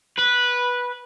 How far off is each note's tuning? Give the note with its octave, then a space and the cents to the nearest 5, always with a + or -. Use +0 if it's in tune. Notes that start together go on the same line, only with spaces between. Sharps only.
B4 -10